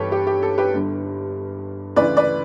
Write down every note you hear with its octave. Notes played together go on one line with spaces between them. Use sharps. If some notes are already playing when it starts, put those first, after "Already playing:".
Already playing: G1 G2 E3 G3 G4 A4 B4 C#5
G4
G4
A4
G4 B4
G1 G2 D3
D2 C#3 E3 B4 D5
B4 D5